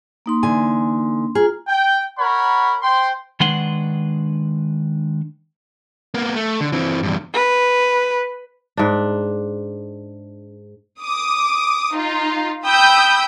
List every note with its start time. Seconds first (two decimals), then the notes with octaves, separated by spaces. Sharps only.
0.26 A#3 D#4 C6
0.43 D3 E3 G#5
1.35 F4 G#4 A#5
1.68 G5
2.18 A#4 C#5 F#5 B5
2.82 C5 G5 C6
3.40 D#3 G#3 D4 B4 F#5 C6
6.14 A#3 B3
6.35 A3
6.61 D3
6.72 E3 C4
7.03 E2 G2
7.34 B4
8.77 G#2 D4
11.02 D6 D#6
11.93 D#4 F4
12.66 G5 B5 D#6 E6 G6